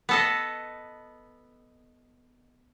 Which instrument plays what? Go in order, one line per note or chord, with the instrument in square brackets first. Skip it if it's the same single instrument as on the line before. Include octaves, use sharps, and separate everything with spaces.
[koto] B3 A4 D#5